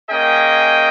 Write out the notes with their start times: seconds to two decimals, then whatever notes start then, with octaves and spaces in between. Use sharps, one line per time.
0.10 A#3 C#4 G#4 D#5 G5